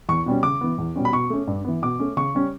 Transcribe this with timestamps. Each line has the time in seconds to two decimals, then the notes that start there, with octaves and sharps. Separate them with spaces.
0.09 E2 C#6
0.26 B2 G3 C#4
0.43 C#3 D6
0.61 E3 B3
0.78 E2
0.96 B2 G3 C#4
1.05 B5
1.12 B2 C#6
1.30 A3 C#4
1.47 G2
1.64 E3 B3
1.82 B2 D6
2.00 A3 C#4
2.17 C#3 C#6
2.35 G3 C#4